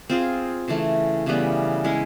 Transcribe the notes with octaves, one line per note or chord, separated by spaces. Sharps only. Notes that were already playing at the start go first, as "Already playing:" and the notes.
C4 F4 G#4
C#3 E3 A3
C#3 E3 G3 B3
G#3 C#4 E4